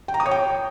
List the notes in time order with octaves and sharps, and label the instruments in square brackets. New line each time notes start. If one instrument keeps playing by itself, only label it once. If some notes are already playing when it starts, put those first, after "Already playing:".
[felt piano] G5
A#5
D#6
C#5
G5